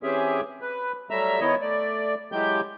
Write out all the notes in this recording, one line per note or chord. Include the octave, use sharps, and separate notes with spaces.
E3 C4 C#4 G4 G#4 E5
B4
F#3 G3 A3 E5 A#5 E6
D#3 B3 E4 C#5 D#5
A3 D5
E3 F#3 G#3 G4 G6